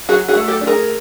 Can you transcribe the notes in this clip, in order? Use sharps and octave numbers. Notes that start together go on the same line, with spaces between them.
F#3 F#4 G#4
F#4 G#4
A3
G4 A4
D4
G#4 A#4